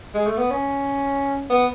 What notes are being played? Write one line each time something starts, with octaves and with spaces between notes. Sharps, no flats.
G#3
A3
B3
C#4
B3